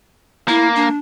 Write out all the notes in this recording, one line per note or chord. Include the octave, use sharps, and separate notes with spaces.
A#3 E4
D4